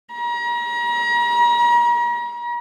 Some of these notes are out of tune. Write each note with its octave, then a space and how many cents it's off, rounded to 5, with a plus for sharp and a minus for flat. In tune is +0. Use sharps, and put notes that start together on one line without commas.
A#5 +40